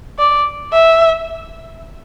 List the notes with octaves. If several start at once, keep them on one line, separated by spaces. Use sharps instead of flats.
D5
E5